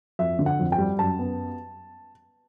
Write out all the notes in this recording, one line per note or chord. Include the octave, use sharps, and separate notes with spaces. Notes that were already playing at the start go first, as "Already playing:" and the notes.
F2 E5
D3
F#5
F2
G5
G3
F#2 A5
B3